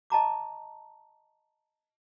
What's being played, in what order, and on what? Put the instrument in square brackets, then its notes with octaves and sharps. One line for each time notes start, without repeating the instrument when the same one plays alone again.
[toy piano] D#5 A5 A#5 D6